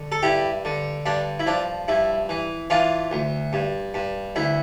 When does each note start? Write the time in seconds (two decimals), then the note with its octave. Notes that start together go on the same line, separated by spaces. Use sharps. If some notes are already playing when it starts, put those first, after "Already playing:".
Already playing: D3
0.12 A4
0.23 G2 E4 G4
0.65 D3
1.06 G2 D4
1.39 E4
1.47 F3 D4
1.88 G2 E4
2.29 E3
2.70 E3 D4 F4
3.11 D2
3.53 G2
3.94 G2
4.36 D2 E4